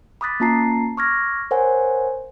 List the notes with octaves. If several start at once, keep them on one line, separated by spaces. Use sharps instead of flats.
B5 D6 D#6 F#6 A6 B6
A#3 C#4 F4 A5 A#5 C7
C#6 D6 F6 G#6 A#6
A#4 C5 C#5 F#5 G#5